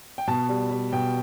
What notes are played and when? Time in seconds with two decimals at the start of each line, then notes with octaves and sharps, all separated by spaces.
0.18 G5
0.27 B2 A5
0.49 G3
0.71 G3
0.92 B2 G5